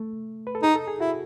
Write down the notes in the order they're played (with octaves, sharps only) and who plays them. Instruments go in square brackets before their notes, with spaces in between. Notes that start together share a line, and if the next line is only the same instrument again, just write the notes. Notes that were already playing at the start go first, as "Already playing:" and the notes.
Already playing: [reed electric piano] A3
B4
A4
[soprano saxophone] D#4 [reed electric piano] G#4
[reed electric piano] A4
G#4
[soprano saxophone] E4 [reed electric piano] F#4